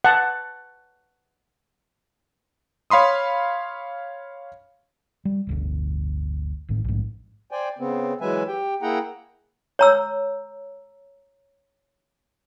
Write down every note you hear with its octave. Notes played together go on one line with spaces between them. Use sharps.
F#5 A5
C#5 F5 B5 C6 D#6
G3
D1 G1 D2
G#1 A2
A#1 G#2
C5 D5 G5 G#5
C#3 B3 C4
E3 F#3 G#3 B4 E5 G#5
G4 G5
A#3 E4 G#4 F#5 G5 A#5
C#5 A#5 E6